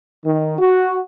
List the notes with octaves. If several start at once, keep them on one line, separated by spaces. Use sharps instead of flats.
D#3
F#4